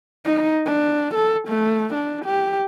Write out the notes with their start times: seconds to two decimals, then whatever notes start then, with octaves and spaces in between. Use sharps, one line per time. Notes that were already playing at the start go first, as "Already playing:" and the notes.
0.25 D#4
0.66 D4
1.14 A4
1.48 A3
1.94 D4
2.25 G4